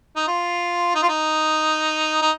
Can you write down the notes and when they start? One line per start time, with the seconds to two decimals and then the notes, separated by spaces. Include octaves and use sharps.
0.16 D#4
0.28 F4
0.95 D#4
1.02 F4
1.09 D#4
2.22 D#4